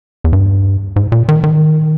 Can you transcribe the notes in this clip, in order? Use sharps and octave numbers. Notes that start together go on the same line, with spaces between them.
E2
G2
G#2
A#2
D#3
D#3